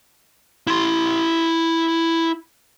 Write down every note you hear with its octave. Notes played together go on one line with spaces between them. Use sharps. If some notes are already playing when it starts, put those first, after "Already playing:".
E4 C6